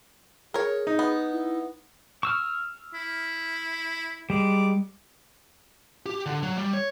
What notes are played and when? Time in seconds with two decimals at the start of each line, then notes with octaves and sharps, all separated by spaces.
0.54 G#4 A#4 C#5
0.87 D#4
0.99 B3
1.33 E4
2.23 C#6 E6 F6
2.94 E4
4.30 G3 G#3 D6
6.06 G4
6.26 D3
6.43 F#3
6.58 G3
6.73 C#5